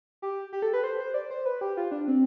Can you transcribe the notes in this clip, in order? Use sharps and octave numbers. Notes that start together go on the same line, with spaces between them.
G4
G4
A4
B4
C5
C5
D5
C5
B4
G4
F4
D4
C4